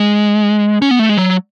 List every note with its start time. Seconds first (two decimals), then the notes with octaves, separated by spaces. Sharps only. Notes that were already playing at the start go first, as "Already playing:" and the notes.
Already playing: G#3
0.82 C#4
0.91 B3
0.99 A3
1.09 G#3
1.18 F#3